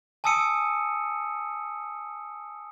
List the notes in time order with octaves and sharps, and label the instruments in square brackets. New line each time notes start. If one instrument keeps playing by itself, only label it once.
[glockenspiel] G#5 A5 D#6 E6 C#7 D#7